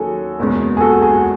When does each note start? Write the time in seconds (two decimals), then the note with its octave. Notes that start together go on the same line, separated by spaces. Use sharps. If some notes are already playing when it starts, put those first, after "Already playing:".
Already playing: D#2 D#3 F#3 C#4 F#4 G#4 A4 C#5
0.39 F#1 E2 B2 G#3 C#4
0.77 G#4
0.81 F#4 A4
0.92 G#4
1.02 G#4
1.13 F#4